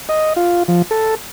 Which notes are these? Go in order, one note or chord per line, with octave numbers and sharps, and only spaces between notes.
D#5
F4
F3
A4